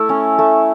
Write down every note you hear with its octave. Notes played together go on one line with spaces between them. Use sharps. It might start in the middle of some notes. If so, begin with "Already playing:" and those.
Already playing: A3 E4
C#4
A3